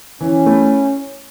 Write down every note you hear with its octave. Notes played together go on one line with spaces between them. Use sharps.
E3 C#4
A3 E4